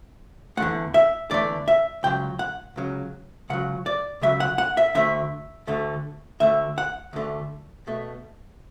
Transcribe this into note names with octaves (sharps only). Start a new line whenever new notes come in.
E2 D3 A3 F#5
E5
E2 D3 A3 D5
E5
C#2 C#3 F#3 G5
F#5
C#2 C#3 F#3
C#2 C#3 F#3 F#5
D5
C#2 C#3 F#3 E5
F#5
F#5
E5
D2 D3 A3 E5
D2 D3 A3
D2 D3 A3 E5
F#5
D2 D3 A3
B2 A3